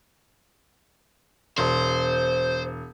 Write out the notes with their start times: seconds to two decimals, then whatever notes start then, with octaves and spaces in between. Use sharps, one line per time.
1.58 E1 C5